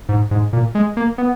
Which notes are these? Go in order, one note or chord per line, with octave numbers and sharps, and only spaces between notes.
G#2
G#2
A#2
G#3
A#3
B3